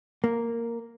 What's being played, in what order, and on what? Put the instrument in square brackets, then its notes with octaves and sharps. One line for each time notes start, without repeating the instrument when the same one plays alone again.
[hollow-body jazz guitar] A#3